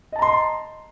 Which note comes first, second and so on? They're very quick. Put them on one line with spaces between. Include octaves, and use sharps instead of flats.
D#5 A5 A#5 C6